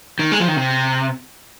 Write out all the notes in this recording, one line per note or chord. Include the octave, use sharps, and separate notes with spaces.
D#3
G#3
F3
D#3
C3